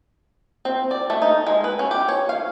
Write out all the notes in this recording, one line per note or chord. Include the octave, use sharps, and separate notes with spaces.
C4
D5
A3
D#4
G#3
B4
C#4
G4
C#5
F5